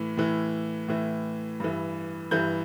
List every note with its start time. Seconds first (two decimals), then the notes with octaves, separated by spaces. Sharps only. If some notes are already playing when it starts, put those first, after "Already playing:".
Already playing: A2 E3
0.17 A2 E3
0.88 A2 E3
1.60 G2 E3
2.31 G2 E3 G6